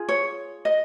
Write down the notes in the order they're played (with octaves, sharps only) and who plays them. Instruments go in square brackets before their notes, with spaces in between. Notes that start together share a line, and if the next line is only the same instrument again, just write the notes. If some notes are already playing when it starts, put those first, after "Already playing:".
Already playing: [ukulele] F4 G#4
C#5
D#5